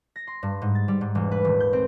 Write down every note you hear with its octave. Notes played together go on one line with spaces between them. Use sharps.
A#6
C6
G2
G#2
A6
G3
G#2
E1
B4
D#1
G6
C4